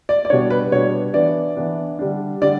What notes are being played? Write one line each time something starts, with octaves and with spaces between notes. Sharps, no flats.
D5
D5
B2 G3 B3 D4 C#5
B4
B2 G3 B3 D4 C#5
E3 B3 D4 D5
E3 B3 D4
D3 G3 D4
D3 G3 D5